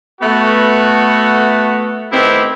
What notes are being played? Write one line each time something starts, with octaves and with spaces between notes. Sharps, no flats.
A3 B3 F#4
D#3 A3 B3 C4 E4 G4